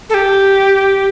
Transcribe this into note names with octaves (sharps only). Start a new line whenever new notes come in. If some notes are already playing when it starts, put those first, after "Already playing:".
A4
G4